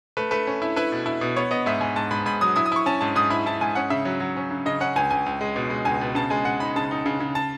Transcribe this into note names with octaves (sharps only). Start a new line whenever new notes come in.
A3 B4
A3 B4
C#4
E4
E4 B4
B2
E4
B2
B3 C#5
B3 D#5
G#2 E5
G#2 G#5
G#2 A5
G#2 B5
G#2 B5
F#3 D#6
E4 D#6
D#6
E4 C#6
C#4 A5
G#2 A5
G#2 D#6
E4 B5
E4 A5
G#2 G#5
C#4 F#5
C#3 E5
F#3
F#3
C#4
C#3
C#3 D#5
C#4 F#5
C#2 G#5
C#2 G#5
C#2
G#3
B2
G#3
C#2 G#5
B2
C#3 A5
G#3 G#5
G#3 F#5
D#4 B5
C#3 A5
D#4
C#3
C#3
A5